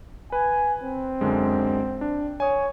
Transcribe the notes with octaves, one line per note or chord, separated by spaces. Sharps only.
B4 G#5
C4
F#2 D3 G#3
D4
C#5 G#5 D#6